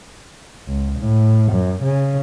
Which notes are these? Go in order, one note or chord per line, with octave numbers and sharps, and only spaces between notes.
C#2
A2
F#2
C#3